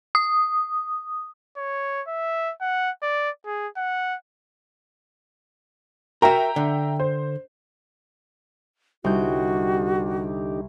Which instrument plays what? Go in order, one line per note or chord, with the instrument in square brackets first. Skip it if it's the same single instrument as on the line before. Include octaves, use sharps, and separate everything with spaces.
[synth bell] D#6
[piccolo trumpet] C#5
E5
F#5
D5
G#4
F#5
[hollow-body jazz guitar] F#4 A#4 [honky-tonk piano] E5 G5 A#5
[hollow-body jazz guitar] D3
[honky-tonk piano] C5
[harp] C2 G6 [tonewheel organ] D3 D#4 G4 [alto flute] F#4